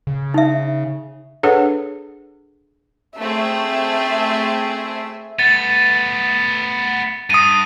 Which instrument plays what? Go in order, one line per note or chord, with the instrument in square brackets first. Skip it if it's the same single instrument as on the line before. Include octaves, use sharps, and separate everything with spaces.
[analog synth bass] C#3
[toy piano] D#4 E5
[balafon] D4 G#4 A4 B4 C#5 F#5
[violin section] A3 C4 G#4 [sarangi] E5
[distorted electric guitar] A3 B3 [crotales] A6
[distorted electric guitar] G2 [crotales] D#6 D#7